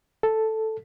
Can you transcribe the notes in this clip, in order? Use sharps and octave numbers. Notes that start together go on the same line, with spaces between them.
A4